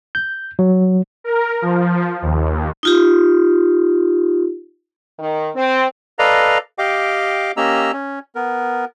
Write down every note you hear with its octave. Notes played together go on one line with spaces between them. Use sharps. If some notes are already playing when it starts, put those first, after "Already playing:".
G6
F#3
A#4
F3
D#2
D#4 F4 G4
D#3
C4
A4 B4 D5 D#5 F5 A#5
G4 D#5 F5 G5 D6
A#3 C#4 G4 D#5 A#5 E6
C#4
B3 A#4